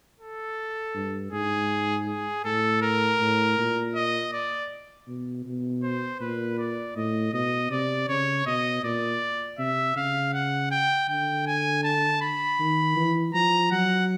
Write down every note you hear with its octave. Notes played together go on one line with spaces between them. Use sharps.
A4
G2
G#2 G#4
G#4
A2 A4
A#4
A2
A#2
D#5
D5
B2
B2
C5
A#2 B4
D5
A2 D#5
B2 D#5
C3 D5
C#3 C#5
B2 D#5
A#2 D5
C3 E5
C#3 F5
F#5
G5
D3 G5
G#5
A5
B5
D#3
E3
F3 A#5
F#3 F#5